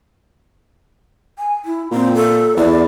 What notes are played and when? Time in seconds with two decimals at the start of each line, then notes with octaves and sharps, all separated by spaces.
1.38 G#5
1.65 E4
1.91 A#2 C4
2.14 A4
2.57 E2 D5